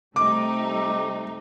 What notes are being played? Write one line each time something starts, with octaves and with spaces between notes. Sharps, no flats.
C3 G3 A3 D#4 D6